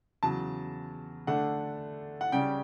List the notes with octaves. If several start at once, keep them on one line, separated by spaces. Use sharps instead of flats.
E2 C#3 F#3 A5
D3 A3 D4 F#5
F#5
C#3 G3 C#4 G5